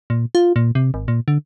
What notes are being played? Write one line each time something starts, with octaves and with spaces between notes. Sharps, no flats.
A#2
F4
A#2
C3
G#1
A#2
D3